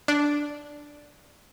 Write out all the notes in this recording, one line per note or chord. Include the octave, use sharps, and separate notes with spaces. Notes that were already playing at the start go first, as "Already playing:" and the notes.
D4